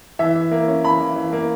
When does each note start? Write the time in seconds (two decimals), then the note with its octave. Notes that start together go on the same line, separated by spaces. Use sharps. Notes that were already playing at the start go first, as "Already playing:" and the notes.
0.19 E3 E5
0.35 E3
0.51 A#3
0.68 C#4
0.84 E3 B5
1.00 E3
1.16 E3
1.32 A#3